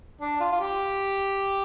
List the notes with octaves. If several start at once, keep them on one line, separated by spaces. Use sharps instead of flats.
D4
F4
F4
G4